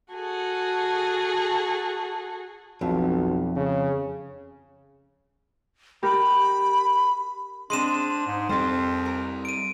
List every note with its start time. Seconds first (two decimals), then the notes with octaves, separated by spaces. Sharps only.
0.13 F#4 G#4 A4
2.81 B1 F2
3.56 C#3
6.03 G4 A#4 B5
7.70 G#3 C4 D4 C6 D#7 E7
8.27 G#2
8.49 F2 G3 C4 G4 C5
9.06 A#4
9.45 D7 D#7